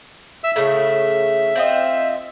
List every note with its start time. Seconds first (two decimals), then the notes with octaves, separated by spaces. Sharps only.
0.44 E5 E6
0.56 A2 C#3 A3 E5
1.56 C4 F4 D#5